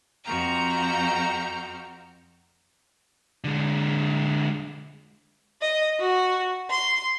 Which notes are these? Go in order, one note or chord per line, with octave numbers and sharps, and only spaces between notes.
F2 F#4 G5 A#5 F6
D3 G#3
D#5
F#4
C6